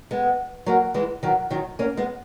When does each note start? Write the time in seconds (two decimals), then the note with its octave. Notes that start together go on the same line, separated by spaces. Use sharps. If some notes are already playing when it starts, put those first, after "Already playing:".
0.11 G#3 B3
0.66 F#3 A#3
0.94 E3 G#3
1.23 D#3 F#3
1.50 D#3 F#3
1.79 A#3 C#4
1.97 G#3 B3